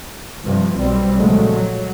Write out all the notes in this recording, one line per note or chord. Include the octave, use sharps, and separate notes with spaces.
G2 C3 F3
B1 G3 C4
A#2 C#3 F3 F#3 G#3 A3
F#3